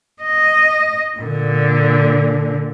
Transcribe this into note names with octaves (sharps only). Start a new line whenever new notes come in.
D#5
A#2 D3